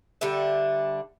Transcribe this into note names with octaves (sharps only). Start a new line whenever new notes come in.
D3 G3 D4 E5